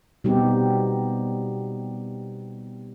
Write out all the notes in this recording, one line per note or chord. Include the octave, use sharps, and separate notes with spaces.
B2 G3 B3 C4 D#4 G4